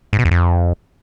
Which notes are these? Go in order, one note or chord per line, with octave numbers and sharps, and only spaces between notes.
G#2
B2
E2
F2